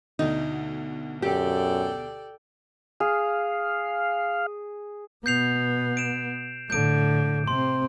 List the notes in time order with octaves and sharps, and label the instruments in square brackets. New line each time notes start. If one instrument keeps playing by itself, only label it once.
[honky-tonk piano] D2 B2 D3 [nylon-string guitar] D#4
[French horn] F#2 [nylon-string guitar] G4 [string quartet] A4 D5 G5
[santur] G#4 [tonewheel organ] F5
[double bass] B2 B3 [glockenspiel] G6 C7 F7
[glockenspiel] D7 E7
[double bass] A2 D3 [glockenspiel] G6 D7
[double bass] C3 C4 [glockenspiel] C6